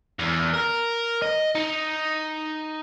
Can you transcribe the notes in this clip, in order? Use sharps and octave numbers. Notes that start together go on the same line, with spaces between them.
E2
A#4
D#5
D#4